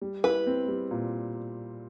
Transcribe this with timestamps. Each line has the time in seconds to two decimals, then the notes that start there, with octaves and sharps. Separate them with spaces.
0.02 G3
0.24 E4 B4
0.46 C4
0.68 G3
0.91 A#2